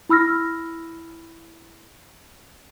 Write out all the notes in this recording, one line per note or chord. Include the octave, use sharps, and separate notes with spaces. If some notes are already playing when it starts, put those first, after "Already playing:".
E4 B5 E6 F6 A#6